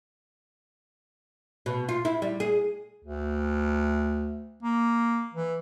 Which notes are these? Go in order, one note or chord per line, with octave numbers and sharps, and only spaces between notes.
B2
F4
E4
G3
G#4
D2
A#3
E3